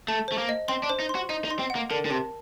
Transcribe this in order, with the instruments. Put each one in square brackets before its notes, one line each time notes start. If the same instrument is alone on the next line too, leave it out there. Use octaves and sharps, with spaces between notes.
[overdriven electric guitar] A3 [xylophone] A5
[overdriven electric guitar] A3 [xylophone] C5
[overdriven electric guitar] A#3
[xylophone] D#5
[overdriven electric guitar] C4 [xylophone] C6
[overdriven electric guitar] D4
[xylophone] C5
[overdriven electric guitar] D#4
[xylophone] C6
[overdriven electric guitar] F#4
[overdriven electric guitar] D#4 [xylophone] D#5
[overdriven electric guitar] D#4
[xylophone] C6
[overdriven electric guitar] C4
[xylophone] F#5
[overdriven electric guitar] A#3
[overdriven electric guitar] D3 [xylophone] A#4
[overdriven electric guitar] D3
[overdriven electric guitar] C3 [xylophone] A5